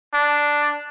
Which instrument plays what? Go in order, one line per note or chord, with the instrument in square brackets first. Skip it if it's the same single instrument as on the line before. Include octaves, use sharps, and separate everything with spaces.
[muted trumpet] D4